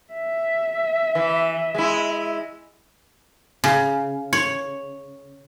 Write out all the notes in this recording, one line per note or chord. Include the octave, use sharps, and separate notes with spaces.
E5
E3
G#3 E4
C#3
C#5